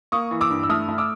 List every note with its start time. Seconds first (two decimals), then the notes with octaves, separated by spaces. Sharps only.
0.12 A#3 C#6 D#6
0.31 E3
0.41 D6 E6
0.50 G2
0.63 E6
0.69 A3 D#6 F6
0.89 A3
0.98 D6 E6